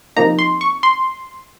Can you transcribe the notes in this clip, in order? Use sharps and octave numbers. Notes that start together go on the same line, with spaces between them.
C3 F3 A#3 D#4 A#5
C6
C#6
C6